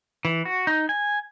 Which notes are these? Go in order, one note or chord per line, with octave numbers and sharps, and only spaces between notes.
E3
F#4
D#4
G#5